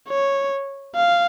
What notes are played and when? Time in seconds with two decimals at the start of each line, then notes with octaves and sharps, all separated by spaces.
0.09 C#5
0.96 F5